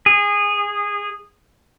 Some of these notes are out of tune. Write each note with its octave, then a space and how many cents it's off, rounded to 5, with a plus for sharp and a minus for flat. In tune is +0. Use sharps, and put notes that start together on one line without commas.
G#4 -20